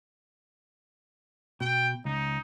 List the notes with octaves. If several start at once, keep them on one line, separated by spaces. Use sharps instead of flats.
B2 G5
C#2 D#4